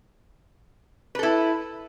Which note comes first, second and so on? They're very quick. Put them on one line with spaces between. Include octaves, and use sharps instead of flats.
B4 A4 E4